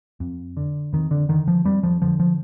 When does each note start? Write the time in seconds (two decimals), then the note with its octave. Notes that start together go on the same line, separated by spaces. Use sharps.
0.20 F2
0.57 D3
0.93 F2 D#3
1.11 D3
1.29 D3 D#3
1.48 F3
1.65 F2 G3
1.83 F3
2.02 D3 F3
2.20 F3